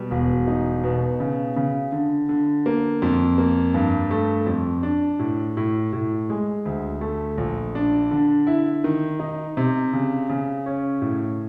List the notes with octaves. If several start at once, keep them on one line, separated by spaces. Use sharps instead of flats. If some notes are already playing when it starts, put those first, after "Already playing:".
Already playing: B2 G3
E1
D#4
B2
C#3
C#3
D3
D3
A#3
F2
A#3
G2
A3
F2
D4
A2
A2
A2
G#3
D2
A3
A#1
D4
D3
E4
D#3
D#4
C3
C#3
C#3
C#4
A2